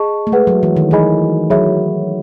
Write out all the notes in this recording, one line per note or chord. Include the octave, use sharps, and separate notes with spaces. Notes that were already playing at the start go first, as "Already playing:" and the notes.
Already playing: G#4 D#5 A5 C#6
A3
G#3 G#4 B4 F#5
F#3
E3
D#3
E3 E4 G#4 D#5 G#5 B5
F#3 G#4 C#5 E5 B5